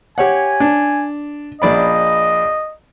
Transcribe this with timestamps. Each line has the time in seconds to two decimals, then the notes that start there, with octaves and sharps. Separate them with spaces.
0.18 G4 C#5 F#5 G#5
0.60 D4
1.62 A#1 D5 D#5 B5